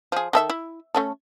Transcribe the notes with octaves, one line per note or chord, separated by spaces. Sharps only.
F3 G#4
D#3 A4 E5
E4
A3 C#4 A4